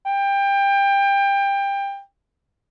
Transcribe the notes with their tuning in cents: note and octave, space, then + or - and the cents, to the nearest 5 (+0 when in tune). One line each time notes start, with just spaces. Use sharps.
G5 +25